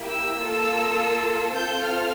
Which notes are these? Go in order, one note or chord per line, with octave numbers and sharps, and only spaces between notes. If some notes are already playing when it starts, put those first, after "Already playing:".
Already playing: A#3 E4 G4
E6
A#3 F4 A4
C4 F4 A4 G6
F6